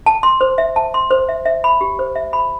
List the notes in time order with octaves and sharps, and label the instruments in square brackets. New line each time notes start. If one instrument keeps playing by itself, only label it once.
[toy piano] A5
C6
C5
E5
A5
C6
C5
E5
E5
B5
G4
C5
E5
B5